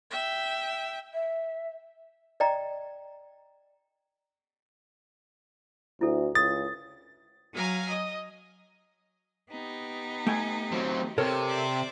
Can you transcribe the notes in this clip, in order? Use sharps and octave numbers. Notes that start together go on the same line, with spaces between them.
E5 G5
E5
D5 D#5 G5 A#5
D2 E4 A4
C#2 D#6 A6
F#3 F5 G#5 A#5
D#5
B3 D#4 G4
A3 G5 G#5
F#3 C4
C3 A4 A#4 C#5 A5
C5 D5 E5